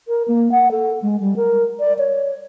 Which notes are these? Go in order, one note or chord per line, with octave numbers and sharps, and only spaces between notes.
A#4
A#3
F#5
A4
G#3
G3
A#4
D5
C#5